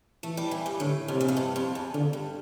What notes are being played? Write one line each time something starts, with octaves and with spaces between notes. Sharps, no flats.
E3 A3
G3
E3
G2
A2 D3
F2 C3
E2
F2
G2
F2
E2
F2 D3
G2